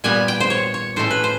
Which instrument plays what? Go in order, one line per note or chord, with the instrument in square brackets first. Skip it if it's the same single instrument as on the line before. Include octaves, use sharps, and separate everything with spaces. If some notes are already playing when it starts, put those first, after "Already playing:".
[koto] A#2 G3 B3 G#5
G5
C5
C#5
C#5
A2 E3 A3 C#4 C5
B4
C5